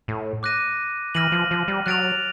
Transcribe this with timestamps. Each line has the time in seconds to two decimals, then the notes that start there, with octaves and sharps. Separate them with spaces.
0.08 A2
0.43 D6 F#6 A#6 D#7
1.15 E3 F6 A#6 D#7 F#7
1.32 F3
1.51 F3
1.68 G3
1.86 F#3 F#6 A6 D7 F7